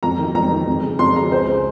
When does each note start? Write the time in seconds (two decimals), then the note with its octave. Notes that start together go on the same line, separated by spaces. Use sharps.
0.03 F2 A#5
0.19 D#3
0.35 F2 A#5
0.51 D#3
0.67 F2
0.83 C#3
0.99 F2 C6
1.15 C#3 A#5
1.31 C#2 C5
1.48 C#3